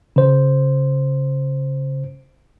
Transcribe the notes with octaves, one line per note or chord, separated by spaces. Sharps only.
C#3 C5